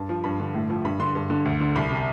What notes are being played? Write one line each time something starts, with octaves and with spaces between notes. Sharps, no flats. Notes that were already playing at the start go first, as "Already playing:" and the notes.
Already playing: G2 A5
F3
G2 B5
D3
A2
F3
G2 B5
D3 C6
G2
D3
D2
D3
C2 B5
C3